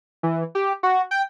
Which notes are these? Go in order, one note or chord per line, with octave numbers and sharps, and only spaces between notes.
E3
G4
F#4
G5